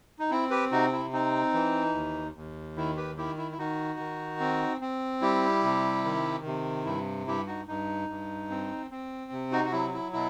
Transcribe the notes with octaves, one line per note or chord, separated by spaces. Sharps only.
D#4
C4 E4
G4 B4
C3 D#4 F#4
E4
C4 D#4
E3
D#2
D#2
D#3 E4
G4 B4
D#3 E4 G4
E4
E4
D#3 D#4 F#4
D#3
C4
C4
G3 E4 G4
C3
D#3
C3
G2 E4
G2 E4 G4
D#4 F#4
G2 D#4
G2
C4
C4
C3
D#4 F#4
F#4
F#3 E4
E4
B2 E4